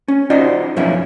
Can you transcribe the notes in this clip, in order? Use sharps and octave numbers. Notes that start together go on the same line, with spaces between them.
C#4
D#4 F4 F#4 C5 D5 D#5
F#2 B2 F3 B3 C#4 E4